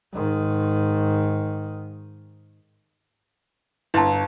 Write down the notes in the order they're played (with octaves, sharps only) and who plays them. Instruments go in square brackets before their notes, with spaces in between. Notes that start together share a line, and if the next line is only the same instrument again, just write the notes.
[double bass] G#2 D#3
[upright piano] G1 [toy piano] E4 A5